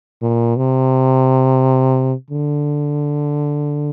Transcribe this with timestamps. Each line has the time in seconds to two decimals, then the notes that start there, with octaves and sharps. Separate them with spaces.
0.22 A#2
0.57 C3
2.30 D3